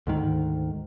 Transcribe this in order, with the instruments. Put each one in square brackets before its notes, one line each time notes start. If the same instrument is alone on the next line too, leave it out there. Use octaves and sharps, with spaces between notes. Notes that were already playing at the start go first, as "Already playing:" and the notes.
[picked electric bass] D2 G#2 D#3